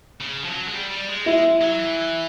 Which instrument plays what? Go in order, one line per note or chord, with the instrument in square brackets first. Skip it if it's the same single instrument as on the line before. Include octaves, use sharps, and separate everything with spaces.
[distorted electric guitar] C#3
F3
F#3
G#3
G3
G3
G#3
[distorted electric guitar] G#3 [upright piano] E4
[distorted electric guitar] F#3
E3